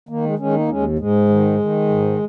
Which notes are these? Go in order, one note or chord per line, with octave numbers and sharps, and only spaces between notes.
D#3 A#3
G#3
D#3 G#3 C#4
A#3 D#4
D#2 G#3 C#4
G#2 G#3
D#3
D#3
G#2